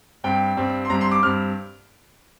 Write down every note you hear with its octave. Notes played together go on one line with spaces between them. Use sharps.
G2 G3 C4 G5
G2 G3 C4
C6
G2 G3 C4 A#5
C6
D6
G2 G3 C4 F6